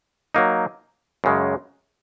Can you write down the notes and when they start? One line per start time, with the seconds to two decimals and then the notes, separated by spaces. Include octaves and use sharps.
0.35 F#3 A#3 D#4
1.24 F#2 C#3 G#3